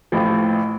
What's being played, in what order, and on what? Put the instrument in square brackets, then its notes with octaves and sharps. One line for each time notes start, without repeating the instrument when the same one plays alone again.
[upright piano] A1 A2 F3